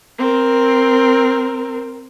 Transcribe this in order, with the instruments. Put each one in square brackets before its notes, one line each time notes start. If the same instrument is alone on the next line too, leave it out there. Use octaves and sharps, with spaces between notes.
[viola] C4 A#4